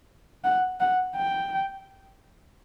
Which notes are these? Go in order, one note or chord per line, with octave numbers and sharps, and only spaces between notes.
F#5
F#5
G5